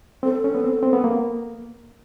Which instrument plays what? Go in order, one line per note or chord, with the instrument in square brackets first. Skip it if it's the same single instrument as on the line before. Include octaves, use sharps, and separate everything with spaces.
[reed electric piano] C4 [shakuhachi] A4
[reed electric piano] C#4
B3
C4
C4
B3
A#3